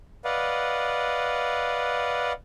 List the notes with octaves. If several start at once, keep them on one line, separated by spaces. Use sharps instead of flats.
B4 D5 D#5 F5 F#5